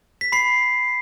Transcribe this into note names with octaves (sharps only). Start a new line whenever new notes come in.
B6
B5 C7